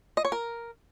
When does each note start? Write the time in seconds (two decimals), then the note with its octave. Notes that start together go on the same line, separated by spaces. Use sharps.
0.17 D#5
0.25 C#5
0.32 A#4